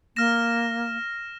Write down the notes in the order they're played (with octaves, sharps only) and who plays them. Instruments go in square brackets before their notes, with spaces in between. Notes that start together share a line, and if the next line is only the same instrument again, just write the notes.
[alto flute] A#3 [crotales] F6 A#6 E7